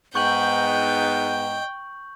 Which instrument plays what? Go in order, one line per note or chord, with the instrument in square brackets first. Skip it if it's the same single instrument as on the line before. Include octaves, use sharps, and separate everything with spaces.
[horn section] G#2 B3 [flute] D#5 [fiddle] G5 [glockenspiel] C#6 G6 F#7